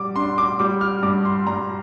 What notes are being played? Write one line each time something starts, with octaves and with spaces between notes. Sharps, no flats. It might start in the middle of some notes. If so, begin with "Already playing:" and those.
Already playing: G3 D6
D4 C6
D6
G3 D6
F6
G2 D6
C6
G2 A#5